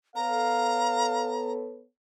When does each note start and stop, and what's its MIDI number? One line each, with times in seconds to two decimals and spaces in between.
0.16 1.85 59
0.16 1.85 69
0.16 1.85 73
0.16 1.37 77
0.16 1.52 82